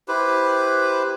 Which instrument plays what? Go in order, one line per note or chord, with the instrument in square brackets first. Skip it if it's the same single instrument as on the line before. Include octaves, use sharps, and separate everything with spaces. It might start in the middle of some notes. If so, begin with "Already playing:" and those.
[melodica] E4 G4 B4 C5